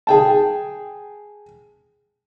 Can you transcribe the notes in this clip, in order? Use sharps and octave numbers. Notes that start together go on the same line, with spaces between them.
G#4 G5 A5